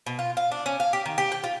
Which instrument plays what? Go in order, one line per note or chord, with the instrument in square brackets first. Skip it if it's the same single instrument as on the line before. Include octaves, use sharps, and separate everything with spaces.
[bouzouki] B2
F4
F5
D4
C#4
F5
G4
D#3
G4
G5
F4